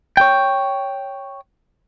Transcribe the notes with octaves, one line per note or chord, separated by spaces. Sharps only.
C#5 G5